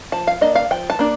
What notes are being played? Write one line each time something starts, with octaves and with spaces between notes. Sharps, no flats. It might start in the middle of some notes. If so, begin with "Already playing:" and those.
F3 A5
F5
A#3 D4 D#5
F5
F3 G5
A5
A#3 D4